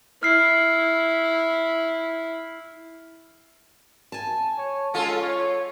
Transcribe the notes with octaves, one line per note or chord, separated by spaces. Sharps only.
E4 F6 C7
G#5 A5
C#5
G#3 C#4 F4 A4
C#5